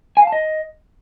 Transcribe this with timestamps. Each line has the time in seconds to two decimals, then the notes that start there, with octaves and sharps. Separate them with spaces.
0.17 G#5
0.22 F5
0.27 A5
0.32 D#5